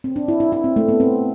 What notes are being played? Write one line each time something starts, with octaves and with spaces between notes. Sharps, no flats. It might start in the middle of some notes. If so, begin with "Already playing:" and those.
C4
D4
E4
E4
E4
C4
A3
B3
C4